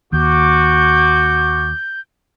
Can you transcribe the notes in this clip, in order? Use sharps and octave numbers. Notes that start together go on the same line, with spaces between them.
D#2 F#4 D6 G6